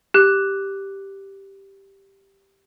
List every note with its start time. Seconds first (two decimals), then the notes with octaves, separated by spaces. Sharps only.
0.14 G4 F#6